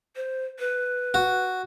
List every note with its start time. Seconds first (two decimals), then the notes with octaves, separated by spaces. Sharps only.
0.16 C5
0.59 B4
1.14 F#4